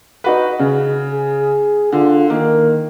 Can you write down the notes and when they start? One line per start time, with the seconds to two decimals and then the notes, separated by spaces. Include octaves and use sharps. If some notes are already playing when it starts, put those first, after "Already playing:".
0.24 D#4 F#4 B4
0.59 C#3
1.12 G#4
1.92 D3 F4
2.30 D#3 A#3